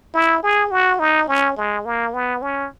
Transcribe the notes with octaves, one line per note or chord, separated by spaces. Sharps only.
E4
G#4
F#4
D#4
C#4
G#3
A#3
B3
C#4